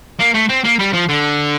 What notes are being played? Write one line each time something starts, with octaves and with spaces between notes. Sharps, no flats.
A#3
A3
C4
A#3
G3
F3
D3